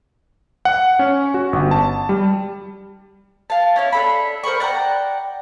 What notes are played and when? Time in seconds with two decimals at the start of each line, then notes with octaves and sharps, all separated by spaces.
0.65 F#5
0.99 C#4
1.34 F#4
1.53 G1
1.71 A5
2.09 G3
3.50 F5 A5
3.76 C#4 E4 C#5
3.92 D4 A4 B5
4.44 A#4 C5 B5 C#6
4.60 D5 F#5 G5 A#5